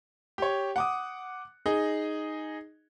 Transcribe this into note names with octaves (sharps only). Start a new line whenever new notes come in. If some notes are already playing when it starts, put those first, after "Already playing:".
G4 C#5
F#5 D6 D#6
D#4 G#4 D#5